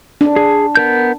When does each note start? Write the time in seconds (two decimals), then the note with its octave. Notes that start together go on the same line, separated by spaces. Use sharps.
0.21 D4
0.36 G#4
0.75 B3 A#4 G6